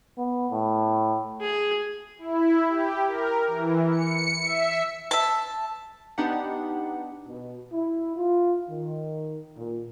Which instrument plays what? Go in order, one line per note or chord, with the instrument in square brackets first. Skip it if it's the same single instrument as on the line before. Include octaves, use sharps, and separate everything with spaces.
[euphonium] B3
A2
[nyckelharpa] G#4
[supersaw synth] E4
G4
A#4
E3
C#7
E5
[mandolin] E5 A5
[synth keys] B3 D4 D#4 G4 F#5
[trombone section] B2
E4
F4
D#3
A#2